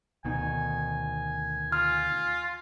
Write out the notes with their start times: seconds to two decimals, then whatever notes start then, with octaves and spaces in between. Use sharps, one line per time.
0.25 D2 B2 D#3 G#5
1.72 F4 F6